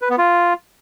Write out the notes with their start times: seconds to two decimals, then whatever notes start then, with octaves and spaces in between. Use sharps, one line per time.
0.02 B4
0.10 B3
0.18 F4